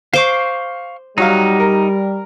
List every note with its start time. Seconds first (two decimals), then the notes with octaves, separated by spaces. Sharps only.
0.13 C5 F5 C#6 D6
1.18 F#3 G3 D#4 F#4 F5
1.60 A#4